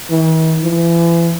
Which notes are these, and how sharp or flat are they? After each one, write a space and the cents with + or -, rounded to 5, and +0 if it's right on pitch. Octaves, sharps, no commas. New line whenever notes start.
E3 -45
E3 +35